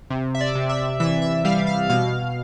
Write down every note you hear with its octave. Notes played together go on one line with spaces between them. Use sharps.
C3
E5
D5
C3
E5
E3 E5
E5
G3 F5
F5
B2 F5